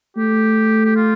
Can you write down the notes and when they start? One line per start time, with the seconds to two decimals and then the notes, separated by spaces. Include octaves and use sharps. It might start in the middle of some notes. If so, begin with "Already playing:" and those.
0.17 A3 G4
0.86 G4
0.96 F4